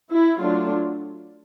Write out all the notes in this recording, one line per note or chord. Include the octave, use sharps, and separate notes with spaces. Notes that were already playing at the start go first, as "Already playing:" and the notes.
E4
F#3 A3 D4 F4